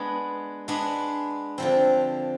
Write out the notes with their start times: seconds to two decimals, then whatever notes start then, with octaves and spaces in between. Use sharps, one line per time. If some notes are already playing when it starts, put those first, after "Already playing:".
Already playing: G#3 B3 D4
0.68 G#3 B3 D4
1.58 D3 F3 C4